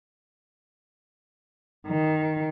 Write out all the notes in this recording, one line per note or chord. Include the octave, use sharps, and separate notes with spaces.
D#3